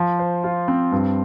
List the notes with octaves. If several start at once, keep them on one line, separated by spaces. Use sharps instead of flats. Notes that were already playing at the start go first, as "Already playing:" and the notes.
Already playing: F3
C5
F4
C4
G2